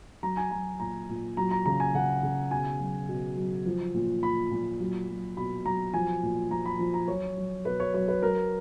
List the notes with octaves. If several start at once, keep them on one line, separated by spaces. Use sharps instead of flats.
F#3 A#5
G#5
F#3 A#5
A#2 A#5
A#2
F#3 A#5
A#5
C#3 A#5
G#5
C#3 F#5
C#3
B2 G#5
F#3
B2
F#3
F3
A#2
A#2 B5
A#2
F#3
F#3
B2 B5
F#3 A#5
F3 G#5
A#2
F3 A#5
B5
F3
A#5
F#3 C#5
F#3
B2 B4
C#5
F#3 C#5
B4
F#3 A#4